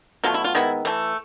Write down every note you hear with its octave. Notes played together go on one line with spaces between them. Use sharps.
B2 F#3 A3 F4
E4
F4
D#3 G#3 B3 E4
E3 A3